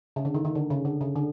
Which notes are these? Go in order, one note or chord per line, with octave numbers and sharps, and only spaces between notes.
C#3
D3
D#3
D#3
D3
C#3
D3
C#3
D3